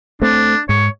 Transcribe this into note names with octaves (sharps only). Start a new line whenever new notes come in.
A3 C4 D4
G#2 C#5